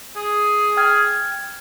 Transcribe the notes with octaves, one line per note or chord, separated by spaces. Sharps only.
G#4
G5 F6 G#6